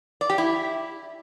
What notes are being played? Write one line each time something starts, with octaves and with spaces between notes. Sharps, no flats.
D5
G4
E4